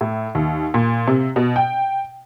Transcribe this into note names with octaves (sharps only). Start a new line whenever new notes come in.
A2
D#2
A#2
C3
B2
G5